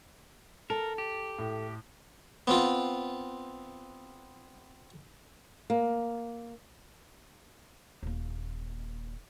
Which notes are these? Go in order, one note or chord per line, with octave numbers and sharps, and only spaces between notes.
A4 A#4 A5
G4
A2
B3 C4 F4
A#3
D#1 A#3